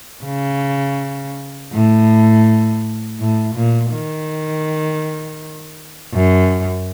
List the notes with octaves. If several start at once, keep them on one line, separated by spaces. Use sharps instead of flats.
C#3
A2
A2
A#2
D#3
F#2